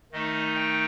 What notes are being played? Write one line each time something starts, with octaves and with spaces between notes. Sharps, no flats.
D#3 A3 D#4 D#5
G5